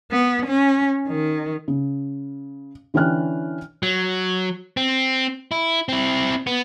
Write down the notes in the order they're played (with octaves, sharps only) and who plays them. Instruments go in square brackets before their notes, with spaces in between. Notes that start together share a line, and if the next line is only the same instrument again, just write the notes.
[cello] B3
C#4
D#3
[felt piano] C#3
D3 E3 C#4 G5 F6 F#6
[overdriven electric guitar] F#3
C4
E4
C4 E4
B3